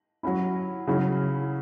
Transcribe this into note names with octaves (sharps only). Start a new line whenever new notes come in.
F#3 C#4 E4
C#3 F#3 C#4 E4